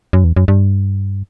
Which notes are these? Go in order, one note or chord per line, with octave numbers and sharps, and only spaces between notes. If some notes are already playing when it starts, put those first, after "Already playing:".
F#2
E2
F#2
G2